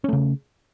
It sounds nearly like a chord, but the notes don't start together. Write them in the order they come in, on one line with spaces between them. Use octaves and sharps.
C#4 A3 C#3